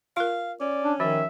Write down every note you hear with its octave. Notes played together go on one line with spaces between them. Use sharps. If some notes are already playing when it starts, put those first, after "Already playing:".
F4 A#4 F5
C#4 D5
D4
D#3 F3 F#4 E5